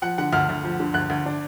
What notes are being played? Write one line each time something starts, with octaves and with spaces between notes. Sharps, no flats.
F3 F#5
D3 F#5
D2 F6
D2
F3
D3
D2 F#6
D2
D4